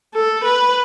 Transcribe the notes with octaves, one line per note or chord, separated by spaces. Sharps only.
A4
B4